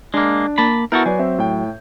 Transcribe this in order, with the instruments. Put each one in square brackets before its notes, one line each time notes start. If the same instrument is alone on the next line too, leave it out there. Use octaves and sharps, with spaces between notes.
[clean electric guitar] G#3 A#3 [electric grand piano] D4
[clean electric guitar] A#3 A5 B5
[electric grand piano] B3 E4 G6 [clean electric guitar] F#4 A4 A#4
[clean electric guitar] F#3 [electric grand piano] B4 D5 G#5
[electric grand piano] C4 E5
A2 G5